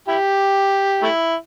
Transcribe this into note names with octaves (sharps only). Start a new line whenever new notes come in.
E4 G4
A3 E4